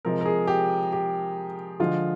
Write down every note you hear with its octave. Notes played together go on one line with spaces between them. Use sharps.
C3 F3 G#3 A#4
A#4
G#4
G4
G4
D3 F3 G#3 F4